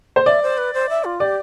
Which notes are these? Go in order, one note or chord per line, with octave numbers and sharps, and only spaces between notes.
C5
D5 E5
C5
B4
C5
E5
F4
G4 D5